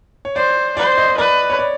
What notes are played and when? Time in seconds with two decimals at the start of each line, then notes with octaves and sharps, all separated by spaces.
0.25 C#5
0.36 C5 D5
0.77 C5 D5
0.97 D#5
1.08 D#5
1.17 B4 D5
1.50 C#5
1.59 D5